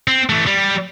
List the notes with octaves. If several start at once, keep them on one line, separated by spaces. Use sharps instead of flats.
C4
E3 A3
G3